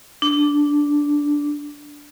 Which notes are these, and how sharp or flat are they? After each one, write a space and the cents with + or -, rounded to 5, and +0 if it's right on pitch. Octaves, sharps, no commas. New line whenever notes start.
D4 -10